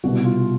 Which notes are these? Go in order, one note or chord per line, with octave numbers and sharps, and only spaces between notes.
C2 B2 G3 F#4
F4